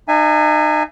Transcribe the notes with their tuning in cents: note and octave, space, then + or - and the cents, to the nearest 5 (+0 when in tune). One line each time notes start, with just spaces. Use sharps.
D#4 -35 E5 +30 G#5 +0